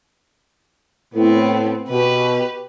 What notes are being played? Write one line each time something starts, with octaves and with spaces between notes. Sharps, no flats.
A2 B3 C4
B2 G4 B4